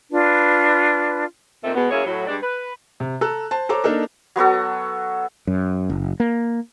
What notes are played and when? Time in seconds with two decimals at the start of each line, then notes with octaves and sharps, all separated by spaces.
0.11 D4 F4 B4
1.63 A#2 D#3 A3 C4
1.75 B2 G#3 B3
1.91 F#2 A#3 E4 G#4 C#5
2.05 A2 F#3
2.27 G2 G#3 D4 D5
2.42 B4
3.00 C3
3.21 A4 A#5 E6 F#6
3.51 C5 A5
3.69 A4 C5 C#5 A#5 D6
3.84 A#3 D4 D#4 A4 A#4
4.36 F#3 B3 F#4 A4
5.47 F#2
5.90 F#1
6.20 A#3